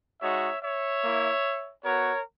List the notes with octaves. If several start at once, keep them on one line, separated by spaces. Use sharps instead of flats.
G#3 D#4 F#4 C#5 E5
C#5 E5
A#3 E4
B3 F#4 A#4 C#5